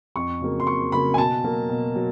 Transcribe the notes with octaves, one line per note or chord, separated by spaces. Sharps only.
F2 C#6
C#3 F#3 A#3
C6
F2 C#6
C#3 F#3 A#3 B5
G#5
B2 A5
F#3 A#3
B2
F#3